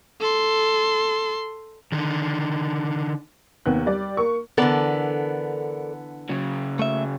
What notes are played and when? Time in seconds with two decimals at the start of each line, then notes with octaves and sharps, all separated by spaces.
0.21 A4 C6
1.92 D3 D#3
3.66 D#2 C3 B3 F#6
3.86 G3 D5
4.17 A#3 C#6
4.58 D3 E3 B3 A4 A#4 D5
6.29 C#3 F#3
6.79 A3 E5